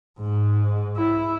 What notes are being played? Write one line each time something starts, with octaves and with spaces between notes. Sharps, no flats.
G#2
E4